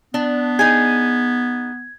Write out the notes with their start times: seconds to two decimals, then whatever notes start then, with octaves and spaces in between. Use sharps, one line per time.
0.14 B3 D4
0.59 D#4 G#4 G#6